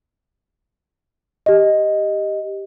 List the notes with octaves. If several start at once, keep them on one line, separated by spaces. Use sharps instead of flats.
G4 D#5